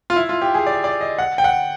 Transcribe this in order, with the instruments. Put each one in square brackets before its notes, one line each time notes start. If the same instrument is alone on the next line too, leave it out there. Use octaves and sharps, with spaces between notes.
[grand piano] F4
E4
F4
G4
G#4
D5
D5
D#5
F#5
G5
F#5